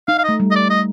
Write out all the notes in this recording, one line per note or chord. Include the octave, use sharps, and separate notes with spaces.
D#4 F5
F5
A3 D#5
G3
D#5
D5
D#5